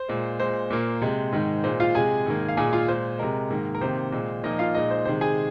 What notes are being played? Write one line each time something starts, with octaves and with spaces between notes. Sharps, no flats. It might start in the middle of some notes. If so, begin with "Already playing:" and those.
Already playing: C5
A#2 G#3
A#2 G#3 C5
A#2 A#3
C3 G#3
G#2 D#3 G#3
A#2 G#3 C5
F4 F5
C3 G#3 G#4 G#5
G#2 D#3 A#3
F5
A#2 G#3 G#4 G#5
F4 F5
A#2 G#3 C5
C3 G#3 A#4
G#2 D#3 A#3
A#4
C3 D#3 A#3 C5
A#2 G#3
A#2 F3 A#3 D#4 D#5
F4 F5
A#2 G#3 D#4 D#5
C5
C3 D#3 G#3 C5
G#4 G#5